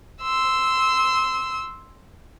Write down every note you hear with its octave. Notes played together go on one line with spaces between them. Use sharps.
C6 E6